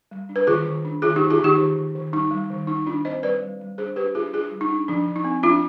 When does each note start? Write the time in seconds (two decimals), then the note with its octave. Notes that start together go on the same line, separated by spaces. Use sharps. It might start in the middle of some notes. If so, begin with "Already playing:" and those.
0.11 G3
0.29 D4
0.36 B4
0.47 D#3 F4 G#4
0.66 D#3
0.85 D4
1.02 D#3 F4 G#4
1.16 D#4 G4
1.21 D#3
1.30 F4 G#4
1.40 D#3 D#4 G4
1.58 D#3
1.76 D#3
1.95 D#3
2.13 G3 D#4
2.31 G3
2.50 D#3
2.67 D#3 D#4
2.86 D#3 D4 F4
3.05 C4 C5 D#5
3.23 G3 B4 D5
3.42 G3
3.60 G3
3.78 D4 G#4 C5
3.96 D4 G4 B4
4.15 D4 F4 G#4
4.33 D4 F4 G#4
4.52 G3
4.61 D#4
4.70 D4
4.88 F3 D4
5.07 F3
5.16 D#4
5.25 C4
5.43 F3 D4 F4